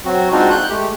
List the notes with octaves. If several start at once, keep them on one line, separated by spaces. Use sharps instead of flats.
F#3 C4 F#4
G#3 C4 D4 D#4 F4 F#4
F#6 G6
G#3 A3 G4